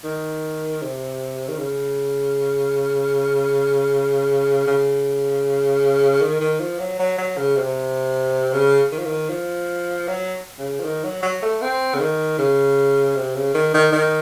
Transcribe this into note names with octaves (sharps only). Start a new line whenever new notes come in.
D#3
C3
D#3
C#3
C#3
D#3
D#3
F3
F#3
F#3
F#3
C#3
C3
C#3
D#3
F3
D#3
F3
F#3
C#3
F3
D#3
F#3
F#3
A3
C4
C#3
D#3
C#3
C3
C#3
D#3
D#3
D#3